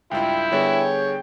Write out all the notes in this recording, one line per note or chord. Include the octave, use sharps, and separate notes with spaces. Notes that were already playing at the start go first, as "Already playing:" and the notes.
C#2 G2 E4 F4 G5
D3 G3 B3 G#4 C#5